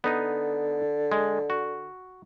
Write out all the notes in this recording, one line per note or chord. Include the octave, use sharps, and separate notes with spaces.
D3 B3 D#4
G#3
F#4